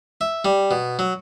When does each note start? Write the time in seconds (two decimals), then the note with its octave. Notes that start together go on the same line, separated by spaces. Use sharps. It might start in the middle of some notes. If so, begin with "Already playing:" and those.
0.21 E5
0.45 G3
0.71 B2
0.99 F#3